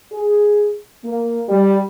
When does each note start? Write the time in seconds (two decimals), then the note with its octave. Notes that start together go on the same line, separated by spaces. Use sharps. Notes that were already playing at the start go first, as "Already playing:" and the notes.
0.12 G#4
1.04 A#3
1.49 G3